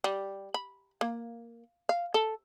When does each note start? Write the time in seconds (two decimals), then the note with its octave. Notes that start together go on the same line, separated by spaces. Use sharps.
0.04 G3
0.54 B5
1.01 A#3
1.89 F5
2.14 A4